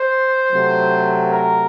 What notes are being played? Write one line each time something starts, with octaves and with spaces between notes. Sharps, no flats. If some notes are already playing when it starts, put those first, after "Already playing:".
Already playing: C5
C3 F#3 A3
A#4